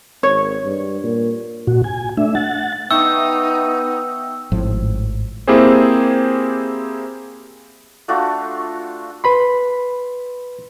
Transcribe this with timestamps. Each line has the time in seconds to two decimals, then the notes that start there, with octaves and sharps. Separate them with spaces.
0.23 G#1 C#5
0.64 G2
1.03 A#2
1.67 A#2 F#4
1.84 G#5
2.17 A3 D4 E5
2.35 F#5 A6
2.91 B3 D#4 E5 G5 C#6 E6
4.52 G#1 A2 F3
5.47 A#3 C4 E4 G4 G#4 C5
8.08 A3 D4 F4 F#4
9.24 B4 B5 C6